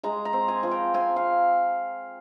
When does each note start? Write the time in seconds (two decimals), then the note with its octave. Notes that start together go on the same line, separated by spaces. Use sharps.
0.03 G#3 A#5
0.25 A#5
0.33 C4
0.48 G#5
0.63 F3
0.71 G5
0.94 C4 G#5
1.16 F5